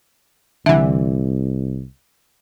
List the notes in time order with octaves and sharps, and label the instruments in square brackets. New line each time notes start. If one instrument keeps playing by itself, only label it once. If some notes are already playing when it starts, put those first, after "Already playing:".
[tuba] C2 [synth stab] D3 E3 [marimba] E5